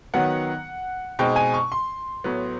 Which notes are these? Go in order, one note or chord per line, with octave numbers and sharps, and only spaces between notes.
D#3 F#3 B3 F#5
B2 G#3 C4 D#4 G5
G#5
C#6
C6
A2 F#3 B3